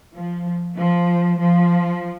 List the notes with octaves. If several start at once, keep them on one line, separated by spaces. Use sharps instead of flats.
F3
F3
F3